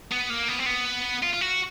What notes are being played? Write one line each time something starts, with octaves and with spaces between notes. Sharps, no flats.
B3
A#3
B3
C4
B3
F4
F4
F#4